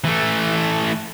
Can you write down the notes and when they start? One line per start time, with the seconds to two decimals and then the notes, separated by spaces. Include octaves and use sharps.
0.04 E3 A3